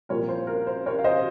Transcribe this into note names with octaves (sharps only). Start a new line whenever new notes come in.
C2 A#2 F3 A#4 C#5
C5
A#4
C5
A#4 C#5
F5
C5 D#5